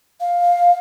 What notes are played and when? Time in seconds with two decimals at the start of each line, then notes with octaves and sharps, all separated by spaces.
0.20 F5